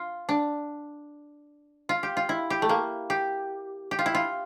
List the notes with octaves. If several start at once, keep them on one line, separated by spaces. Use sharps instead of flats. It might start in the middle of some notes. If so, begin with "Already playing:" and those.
Already playing: F4
D4
F4
G4
F4
E4
G4
A3
A#3
G4
G4
F4
E4
F4